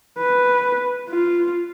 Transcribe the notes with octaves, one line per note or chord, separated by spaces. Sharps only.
B4
F4